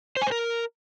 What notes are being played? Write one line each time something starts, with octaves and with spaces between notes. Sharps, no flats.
C5
G#5
C5
A#4